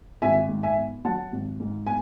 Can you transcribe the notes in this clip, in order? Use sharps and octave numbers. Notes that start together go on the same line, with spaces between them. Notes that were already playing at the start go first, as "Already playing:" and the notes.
G#1 E5 G#5
G#2
E5 G#5
B3
F#3 F#5 A5
G#1
G#2
B3 G#5